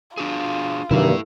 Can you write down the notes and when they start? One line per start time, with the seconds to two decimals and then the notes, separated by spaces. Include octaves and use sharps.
0.17 D4 F4 F#4 G#4
0.91 G2 C3 D#3 E3 F#3 A#3 E4 A4